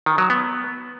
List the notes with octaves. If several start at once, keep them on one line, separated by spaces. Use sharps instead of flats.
D#3
F#3
B3